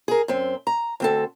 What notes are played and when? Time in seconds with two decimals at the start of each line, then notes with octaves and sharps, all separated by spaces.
0.08 G#4 A#4
0.28 F#2 C4
0.67 A#5
1.00 D2 C4 A4